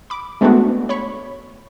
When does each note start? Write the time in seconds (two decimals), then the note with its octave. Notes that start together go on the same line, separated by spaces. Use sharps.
0.10 B5 D6
0.41 G#3 A3 B3 C4 D4 F#4
0.89 C#5 B5 C#6